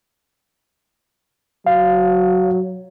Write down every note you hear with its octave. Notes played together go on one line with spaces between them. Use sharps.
F#3 F5